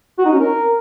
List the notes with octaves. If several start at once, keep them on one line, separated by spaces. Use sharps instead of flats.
F#4
D#4
C#4
A#4